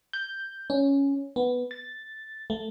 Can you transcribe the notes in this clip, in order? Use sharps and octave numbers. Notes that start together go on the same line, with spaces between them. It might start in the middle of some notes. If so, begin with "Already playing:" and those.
G6
C#4
B3
A6
A3